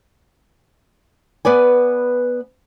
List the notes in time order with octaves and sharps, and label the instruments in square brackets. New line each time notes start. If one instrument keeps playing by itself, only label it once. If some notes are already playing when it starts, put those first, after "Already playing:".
[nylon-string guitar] B3 B4 D5 G#5